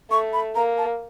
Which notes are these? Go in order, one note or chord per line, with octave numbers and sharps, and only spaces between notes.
A3 C#6
B5
A#3 A#5
A5